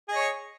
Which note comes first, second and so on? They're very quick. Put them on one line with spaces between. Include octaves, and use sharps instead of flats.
G#4 D#5 C#5